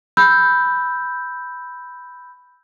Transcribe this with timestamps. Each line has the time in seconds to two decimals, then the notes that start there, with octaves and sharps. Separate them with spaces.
0.17 B5 E6 G6